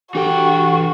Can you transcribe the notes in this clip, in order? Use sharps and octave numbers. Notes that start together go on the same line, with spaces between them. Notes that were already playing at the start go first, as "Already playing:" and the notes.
E3 D4 F#4 G4 A4 G5